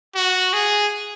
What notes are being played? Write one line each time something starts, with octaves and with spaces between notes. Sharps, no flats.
F#4
G#4